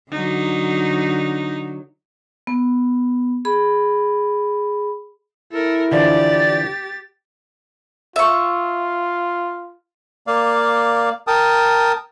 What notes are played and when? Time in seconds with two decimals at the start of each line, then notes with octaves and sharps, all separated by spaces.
0.12 D3 F#3 D#4
2.47 B3
3.45 G#4 B5
5.53 E4 A4 A#4
5.92 D3 E3 F3 G4 D5 A6
8.16 F4 E5 C#6
10.27 A#3 D5 F5
11.27 A#4 G5 A5 D#6